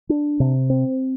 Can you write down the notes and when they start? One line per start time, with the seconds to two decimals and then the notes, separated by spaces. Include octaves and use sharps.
0.09 D4
0.40 C3
0.70 C4